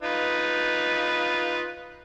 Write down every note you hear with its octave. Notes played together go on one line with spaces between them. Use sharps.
D#4 F4 B4